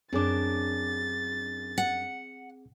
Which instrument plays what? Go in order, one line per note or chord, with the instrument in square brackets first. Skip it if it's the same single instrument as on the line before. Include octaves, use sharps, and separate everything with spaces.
[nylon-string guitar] F#2 D4 [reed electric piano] C4 G#4 D6 [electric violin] A6
[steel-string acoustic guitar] F#5